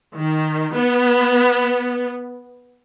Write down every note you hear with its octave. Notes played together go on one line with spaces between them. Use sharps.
D#3
B3